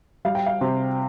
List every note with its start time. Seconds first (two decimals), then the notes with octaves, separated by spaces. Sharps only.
0.25 G3 F5
0.35 G5
0.46 F5
0.61 C3 C5